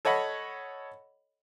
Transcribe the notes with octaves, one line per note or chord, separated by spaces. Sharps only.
A4 C#5 D#5 F#5 B5